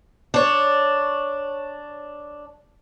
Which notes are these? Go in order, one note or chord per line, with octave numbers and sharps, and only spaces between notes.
D4 C#5